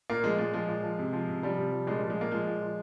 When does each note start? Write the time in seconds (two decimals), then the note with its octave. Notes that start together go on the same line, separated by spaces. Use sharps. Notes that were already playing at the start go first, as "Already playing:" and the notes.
0.10 A#2 A#3
0.23 F3 G#3
0.38 A#2 G#3
0.53 F3 G#3
0.68 A#2
0.83 F3
0.98 C3
1.13 F3
1.28 C3
1.43 F3 G3
1.57 C3
1.72 F3
1.87 A#2 G#3
1.98 F3 G3
2.10 G#3
2.17 A#2 A#3
2.31 F3 G#3
2.47 A#2
2.61 F3